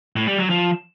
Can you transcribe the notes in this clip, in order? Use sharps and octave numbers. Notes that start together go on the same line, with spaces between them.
A2
G3
F#3
F3